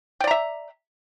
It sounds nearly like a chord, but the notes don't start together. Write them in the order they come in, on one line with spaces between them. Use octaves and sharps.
G5 D5 A#5 E5